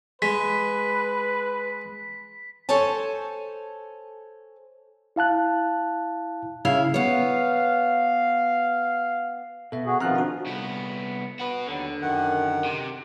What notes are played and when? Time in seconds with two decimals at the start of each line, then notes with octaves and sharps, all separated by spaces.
0.22 G#3 B4 B6
2.69 A4 C5 C#5 G#5 A5
5.16 E4 F5 A5 F#6
6.65 C#3 E4 F5
6.94 B3 C#5 F5
9.72 B2 A4 E5
9.86 F#4 G#4
10.01 D#3 F3 B3 C4 F4 A#5 F6 F#6
10.15 D4 F#4
10.46 C2 B3
11.40 F#4 B4
11.67 D#2 D3 F#3 B3
12.01 F#2 D#3 F#5
12.65 C3